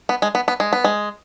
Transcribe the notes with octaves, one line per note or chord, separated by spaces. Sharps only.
B3
G#3
B3
B3
G#3
B3
G#3